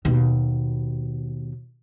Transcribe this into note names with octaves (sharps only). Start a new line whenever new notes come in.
D#2 B2